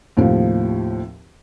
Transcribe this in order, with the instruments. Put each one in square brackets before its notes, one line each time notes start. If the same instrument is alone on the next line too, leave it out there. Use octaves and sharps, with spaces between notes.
[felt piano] D#2 A2 C3 F3